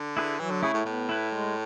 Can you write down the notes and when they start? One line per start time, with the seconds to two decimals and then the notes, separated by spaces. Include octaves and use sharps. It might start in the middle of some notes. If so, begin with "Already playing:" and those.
Already playing: D3
0.17 E4 G#4 B4
0.40 E3 F#3
0.51 D3
0.62 C#3 A3 E4 G#4 C#5
0.74 A2
0.85 A2 B3
1.09 E4 B4
1.32 G#3